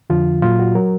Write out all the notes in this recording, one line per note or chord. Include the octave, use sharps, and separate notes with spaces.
F2 D3 F3 F4
A#2 F#3 F4
F#4
F#3 A#4